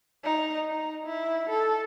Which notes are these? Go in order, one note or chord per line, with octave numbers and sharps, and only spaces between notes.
D#4
D#4
E4
A4